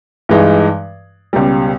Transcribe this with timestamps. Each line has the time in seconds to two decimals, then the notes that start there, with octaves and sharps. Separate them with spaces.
0.29 G2 E3 G#3 D#4
1.33 C#2 B2 G3